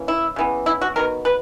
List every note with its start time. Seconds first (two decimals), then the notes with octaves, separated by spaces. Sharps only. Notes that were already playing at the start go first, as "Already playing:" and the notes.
Already playing: E3 A#3 C#4
0.08 E4
0.36 C#3 E3 B3
0.66 E4
0.81 F#4
0.96 D#3 F#3 B3 A#4
1.25 B4